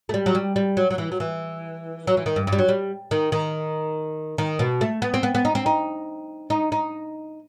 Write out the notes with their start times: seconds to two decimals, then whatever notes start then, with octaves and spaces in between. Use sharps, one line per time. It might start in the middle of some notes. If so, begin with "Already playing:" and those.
0.09 A3
0.14 G3
0.26 F#3
0.35 G3
0.56 G3
0.77 F#3
0.90 F#3
0.98 E3
1.12 F#3
1.20 E3
2.07 F#3
2.17 E3
2.26 D#3
2.36 G2
2.47 G2
2.52 G3
2.59 F#3
2.68 G3
3.11 D#3
3.32 D#3
4.38 D#3
4.59 B2
4.81 A3
5.02 B3
5.14 C4
5.23 B3
5.35 B3
5.45 D#4
5.55 C4
5.66 D#4
6.50 D#4
6.72 D#4